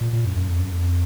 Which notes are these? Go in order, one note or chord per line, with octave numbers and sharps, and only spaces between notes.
A#2
A#2
F#2
F#2
F2
F#2
F2